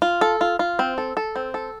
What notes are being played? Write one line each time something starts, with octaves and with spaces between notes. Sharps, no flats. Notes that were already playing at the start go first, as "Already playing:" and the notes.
F4
A4
F4
F4
C4
A4
A4
C4
A4